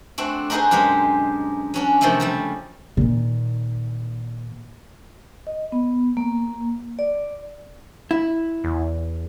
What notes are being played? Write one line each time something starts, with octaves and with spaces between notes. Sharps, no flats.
A3 C4 D4 F#4
D4 D#4 F#4 G#4 B4 C5
F#2 B2 G#3 G4 C5
F#3 C#4 D4
C3 D#3 F3 F#3 A3
C#3 F3 G3
A#2 D#3
D#5
B3
A#3
D5
E4
E2